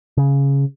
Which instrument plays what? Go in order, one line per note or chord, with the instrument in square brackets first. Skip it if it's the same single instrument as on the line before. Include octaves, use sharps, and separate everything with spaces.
[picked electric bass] C#3